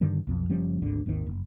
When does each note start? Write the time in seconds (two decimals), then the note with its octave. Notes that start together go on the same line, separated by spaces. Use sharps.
0.01 G2 D3 D#3 G3
0.27 B1 F2
0.49 F#1 F3 G3 C#4
0.82 G#1 D2 G#2 D3
1.06 G#1 D#2 C3 D#3
1.26 F#1